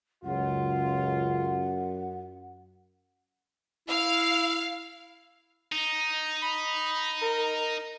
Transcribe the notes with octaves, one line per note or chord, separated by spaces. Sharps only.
C#2 F#2 F4 F#5
E4 F5
D#4
B5
A#4